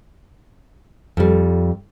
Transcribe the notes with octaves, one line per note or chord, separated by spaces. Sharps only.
F2 G3